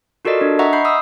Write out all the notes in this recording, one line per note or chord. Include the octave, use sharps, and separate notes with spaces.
F4 F#4 A4 A#4 D5 D#5
D4
D#5 E5 F#5 A#5 C#6
B5 G6 C7
D#6 E6